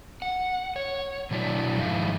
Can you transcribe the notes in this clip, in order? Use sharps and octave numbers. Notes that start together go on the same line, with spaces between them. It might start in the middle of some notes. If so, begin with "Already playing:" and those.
F#5
C#5
B2 F#3 D4 E4 F#4
F2 G#2 D#3 E4 F5